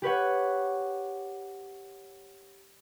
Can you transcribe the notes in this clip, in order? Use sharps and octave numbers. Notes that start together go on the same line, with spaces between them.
G4 B4 C#5 F#5